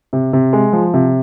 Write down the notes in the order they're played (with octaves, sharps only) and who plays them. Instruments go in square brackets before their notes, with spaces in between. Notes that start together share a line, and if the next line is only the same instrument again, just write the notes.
[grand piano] C3
C3
G#3
F3
C3